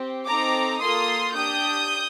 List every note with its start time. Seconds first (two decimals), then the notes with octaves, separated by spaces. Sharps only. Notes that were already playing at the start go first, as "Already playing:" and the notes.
Already playing: C4 G4
0.27 C4 D#4 A4 A#5 D6
0.81 A#3 F4 A4 C6 D#6
1.34 D4 G4 D#6 G6